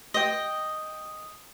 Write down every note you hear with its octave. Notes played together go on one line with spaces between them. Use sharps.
D#5 G5